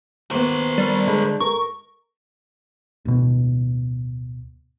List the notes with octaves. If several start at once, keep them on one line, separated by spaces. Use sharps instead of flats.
D#2 B3 A#4 C5
G3
D3 G#3
A#4 C#6
D1 B2